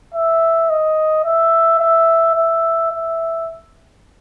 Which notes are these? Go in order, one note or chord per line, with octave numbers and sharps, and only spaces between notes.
E5
D#5
E5
E5
E5
E5